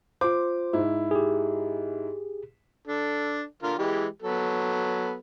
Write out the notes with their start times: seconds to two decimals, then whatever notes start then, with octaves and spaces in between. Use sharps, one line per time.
0.21 F4 C5 D6
0.73 G#2 E4
1.11 G4 G#4
2.87 D4 A4
3.63 D3 F4 A#4
3.78 E3 G#3 G4
4.22 F#3 B3 A4